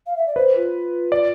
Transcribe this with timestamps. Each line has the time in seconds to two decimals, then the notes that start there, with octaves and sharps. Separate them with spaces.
0.06 F5
0.16 E5
0.27 D5
0.36 B4 C5
0.55 F4
1.12 D5